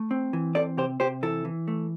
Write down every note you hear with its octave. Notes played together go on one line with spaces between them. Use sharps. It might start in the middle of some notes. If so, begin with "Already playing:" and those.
Already playing: A3
C4
E3
C4 A4 D5
C3 G4 C5
C3 G4 C5
E3 E4 A4
E3
A3